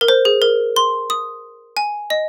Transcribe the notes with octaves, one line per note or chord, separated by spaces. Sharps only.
A#4
C5
G#4
A#4
C6
D#6
G#5
D#5